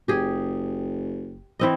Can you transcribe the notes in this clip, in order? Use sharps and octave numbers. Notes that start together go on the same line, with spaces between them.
F#1 G4 G#4
E3 C4 D#5